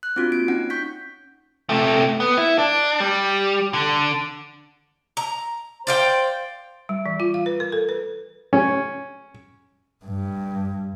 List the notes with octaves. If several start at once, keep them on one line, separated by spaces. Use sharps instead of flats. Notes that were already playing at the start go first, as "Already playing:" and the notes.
F#6
C4 D4 F4 F#4
A#3 D7
C#4 D#4 F#5
C#6 G6 B6
C3 A3
B3
E4
D4
G3
D3
A#5
C5 D5 F5 G5
G3
E3
F4
F5
B4
A#4
A4
B4
C#4
G2